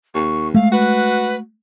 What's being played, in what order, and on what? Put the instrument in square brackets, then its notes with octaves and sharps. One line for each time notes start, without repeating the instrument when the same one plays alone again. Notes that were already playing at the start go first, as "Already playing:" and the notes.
[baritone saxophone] D#2 [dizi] C#6
[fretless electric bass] G#3 A3 [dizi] F5
[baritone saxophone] F#4 [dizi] B4